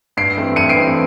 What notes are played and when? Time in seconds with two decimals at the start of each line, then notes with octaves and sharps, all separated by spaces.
0.17 G2 C7 D7
0.37 E3 A3 C4
0.56 G2 C#7 D#7
0.69 C7 D7
0.76 E3 A3 C4